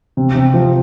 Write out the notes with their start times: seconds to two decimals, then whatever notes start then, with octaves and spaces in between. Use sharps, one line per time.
0.17 C3
0.35 C3
0.54 F3